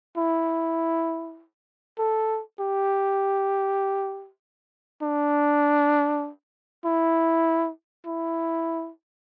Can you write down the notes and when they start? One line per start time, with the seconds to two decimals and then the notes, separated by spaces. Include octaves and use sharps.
0.17 E4
1.99 A4
2.60 G4
5.03 D4
6.85 E4
8.06 E4